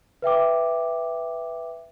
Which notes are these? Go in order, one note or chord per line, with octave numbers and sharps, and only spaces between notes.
B4 E5 G5 D6